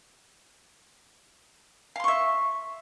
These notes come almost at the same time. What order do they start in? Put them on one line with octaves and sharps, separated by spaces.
F5 C6 C#6 E5